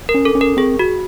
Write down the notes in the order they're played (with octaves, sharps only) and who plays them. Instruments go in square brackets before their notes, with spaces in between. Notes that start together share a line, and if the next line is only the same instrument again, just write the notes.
[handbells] A#4
[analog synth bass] C#4
[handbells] A4
[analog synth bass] C#4
[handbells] A#4
[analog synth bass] C4 [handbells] G#4
[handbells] F#4